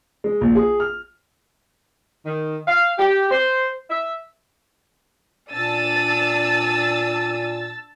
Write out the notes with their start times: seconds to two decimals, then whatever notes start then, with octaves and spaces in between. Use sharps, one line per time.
0.24 G#3
0.41 A#1
0.55 G#4
0.80 F6
2.25 D#3
2.68 F5
2.99 G4
3.31 C5
3.90 E5
5.53 A#2 D4 A5 E6 A6 D#7